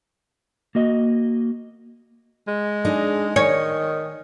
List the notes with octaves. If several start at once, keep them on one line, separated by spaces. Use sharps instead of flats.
A#3 F#4 D#5
G#3
D4 D#4 G#4
D#3 C#5 D#5 G#5